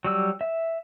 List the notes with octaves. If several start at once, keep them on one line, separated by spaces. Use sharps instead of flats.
F#3 G3 E6
E5